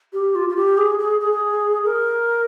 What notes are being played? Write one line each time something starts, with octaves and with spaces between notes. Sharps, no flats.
G4
F4
F4
G4
G#4
G#4
G#4
A#4